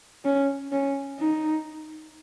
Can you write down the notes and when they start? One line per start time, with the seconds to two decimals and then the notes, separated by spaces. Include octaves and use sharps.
0.25 C#4
0.72 C#4
1.19 D#4